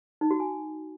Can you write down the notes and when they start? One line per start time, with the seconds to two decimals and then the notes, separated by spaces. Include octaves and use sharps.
0.21 D#4
0.31 F#4
0.40 G#5